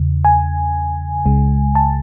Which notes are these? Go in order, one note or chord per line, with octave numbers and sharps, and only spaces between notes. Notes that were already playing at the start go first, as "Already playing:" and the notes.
Already playing: E2 C#3
G#5
C#2 C#3 G#3
A5